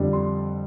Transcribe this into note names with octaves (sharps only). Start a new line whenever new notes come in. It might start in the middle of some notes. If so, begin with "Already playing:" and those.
Already playing: F2 D3 G3 D4
C6